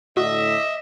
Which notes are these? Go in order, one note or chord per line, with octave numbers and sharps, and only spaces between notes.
A2 D3 F#4 D#5 E5